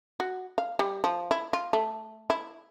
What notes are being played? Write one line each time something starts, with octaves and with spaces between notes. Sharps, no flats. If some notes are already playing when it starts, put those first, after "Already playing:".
F#4
F5
G3
F3
E4
F4
A3
E4